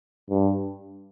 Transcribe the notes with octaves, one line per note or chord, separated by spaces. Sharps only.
G2